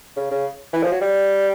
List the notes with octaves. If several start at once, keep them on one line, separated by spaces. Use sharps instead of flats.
C#3
C#3
E3
F3
F#3
G3